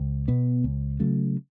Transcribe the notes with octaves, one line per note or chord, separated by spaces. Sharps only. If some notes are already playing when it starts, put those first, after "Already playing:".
Already playing: C#2
B2 B3
C#2
C#3 F#3 A3